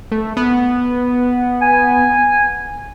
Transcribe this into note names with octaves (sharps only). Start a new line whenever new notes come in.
A3
B3
G#5